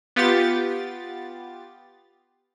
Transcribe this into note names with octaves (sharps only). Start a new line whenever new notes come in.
B3 F4 G4 A6